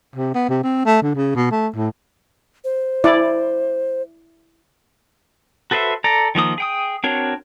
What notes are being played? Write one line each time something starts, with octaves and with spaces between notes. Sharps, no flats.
C3
B3
C3
C4
A3
D3
C#3
B2
A3
A2
C5
E4 D5
F#4 A4 B4 C5 E5
A4 D5 A#5
D#3 F3 A#3 D#6
G#4 G5 D#6
C4 D4 F#4 A#4 C#5